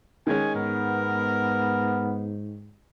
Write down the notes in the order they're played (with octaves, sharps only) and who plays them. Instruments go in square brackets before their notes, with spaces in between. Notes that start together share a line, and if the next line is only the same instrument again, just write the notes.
[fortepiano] D#3 G#3 C#4 [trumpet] G#5
[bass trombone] G#2 [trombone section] B3 [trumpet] A#4